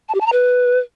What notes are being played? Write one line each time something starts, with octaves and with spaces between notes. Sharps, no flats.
A5
G4
A5
A#5
B4